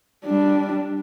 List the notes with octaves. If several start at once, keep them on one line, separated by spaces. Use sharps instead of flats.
G3 D4